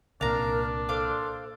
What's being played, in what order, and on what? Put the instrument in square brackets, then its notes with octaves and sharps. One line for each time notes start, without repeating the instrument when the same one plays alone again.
[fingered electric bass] C2 A#2 [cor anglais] D4 [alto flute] A#4 [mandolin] F5 A#5
[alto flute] A4 [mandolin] C5 F5 D6